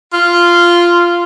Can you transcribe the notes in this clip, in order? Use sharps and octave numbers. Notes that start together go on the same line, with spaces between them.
F4